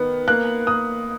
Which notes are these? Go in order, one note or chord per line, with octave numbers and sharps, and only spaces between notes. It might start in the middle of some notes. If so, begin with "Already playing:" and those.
Already playing: D#3 B3
A#3 F#6
A#3 D#6